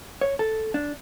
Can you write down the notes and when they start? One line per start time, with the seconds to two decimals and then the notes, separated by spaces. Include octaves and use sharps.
0.21 C#5
0.39 A4
0.74 D4